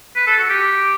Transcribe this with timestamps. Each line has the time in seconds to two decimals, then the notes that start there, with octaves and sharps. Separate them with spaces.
0.16 B4
0.27 A4
0.38 F#4
0.49 G4